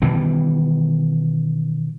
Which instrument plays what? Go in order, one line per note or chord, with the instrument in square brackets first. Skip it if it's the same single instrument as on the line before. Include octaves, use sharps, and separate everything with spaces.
[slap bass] B2 D#3 E3 G3